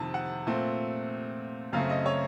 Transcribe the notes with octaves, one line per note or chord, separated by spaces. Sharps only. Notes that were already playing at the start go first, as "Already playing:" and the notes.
Already playing: F2 C3 D#3 A5
F#5
A#2 A3 C4
F#2 C#3 A3 C4 F5
D#5
C#5